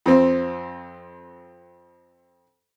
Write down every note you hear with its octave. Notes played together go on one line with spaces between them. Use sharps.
F2 C4